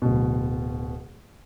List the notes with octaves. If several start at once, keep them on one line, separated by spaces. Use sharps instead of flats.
D1 B2